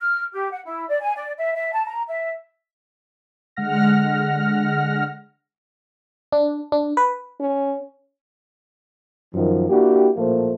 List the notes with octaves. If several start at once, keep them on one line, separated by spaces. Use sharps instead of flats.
F6
G4
F#5
E4
D5
G#5
D5
E5
E5
A5
A#5
E5
D3 G#3 F#5 F6 A#6
D4
D4
B4
C#4
F#2 D#3 F3
A#3 D4 E4 F#4 G4
A1 A#2 F3 A3 A#3 C5